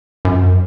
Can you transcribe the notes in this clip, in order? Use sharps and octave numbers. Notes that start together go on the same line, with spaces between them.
F#2